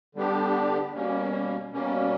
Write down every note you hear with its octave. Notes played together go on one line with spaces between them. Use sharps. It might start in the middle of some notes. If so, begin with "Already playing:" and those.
D3 G3 B3 D4 G4
B2 G3 A#3 C#4
B2 G3 A#3 C#4